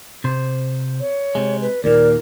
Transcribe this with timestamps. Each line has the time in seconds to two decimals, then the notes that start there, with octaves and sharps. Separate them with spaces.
0.24 C3 C5
1.00 C#5
1.35 C3 G#3
1.62 B4
1.84 D#2 A#2 A#4 D5